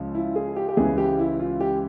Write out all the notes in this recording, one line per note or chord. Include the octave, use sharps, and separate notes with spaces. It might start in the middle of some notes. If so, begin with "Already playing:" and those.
Already playing: C#2 C#3 F3
E4
G#4
G4
G4
C#2 C#3 E3 G#4
G4
E4
F4
G4